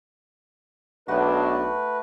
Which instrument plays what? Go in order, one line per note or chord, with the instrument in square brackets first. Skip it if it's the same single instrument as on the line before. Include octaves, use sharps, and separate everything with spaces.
[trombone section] B1 [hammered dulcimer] A3 F#4 [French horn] D4 [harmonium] B4